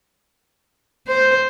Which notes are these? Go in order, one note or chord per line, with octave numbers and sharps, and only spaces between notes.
C5